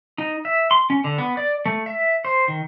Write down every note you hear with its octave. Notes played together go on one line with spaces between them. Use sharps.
D#4
E5
C6
C#4
D3
B3
D5
A3
E5
C5
D#3